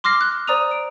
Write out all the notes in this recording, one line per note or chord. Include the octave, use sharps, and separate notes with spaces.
C6 D6 F6 A#6 C7
F#6
C5 D5 A#5 D#6 D#7 F7
D7